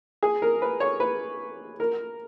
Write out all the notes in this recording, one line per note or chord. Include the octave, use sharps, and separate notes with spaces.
G#4
A#4
B4
C#5
B4
A#4